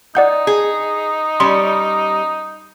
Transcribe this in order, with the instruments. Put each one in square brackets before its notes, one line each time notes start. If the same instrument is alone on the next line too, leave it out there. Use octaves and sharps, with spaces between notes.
[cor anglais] D#4 [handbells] D5 F#5 G6
[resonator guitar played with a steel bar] G#4
[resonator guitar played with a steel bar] G3 C#4 [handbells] C6